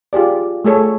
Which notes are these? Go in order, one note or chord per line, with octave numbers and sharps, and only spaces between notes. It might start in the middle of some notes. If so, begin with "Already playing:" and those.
F4 G4 G#4 D5
A3 G#4 A4 C#5